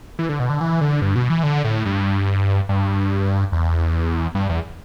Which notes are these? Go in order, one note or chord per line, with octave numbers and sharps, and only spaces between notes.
E3
D3
B2
D3
E3
D3
G2
B2
E3
D3
A2
G2
G2
E2
G2
E2